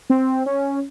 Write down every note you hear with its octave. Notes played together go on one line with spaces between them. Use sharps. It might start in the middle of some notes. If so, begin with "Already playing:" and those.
C4
C#4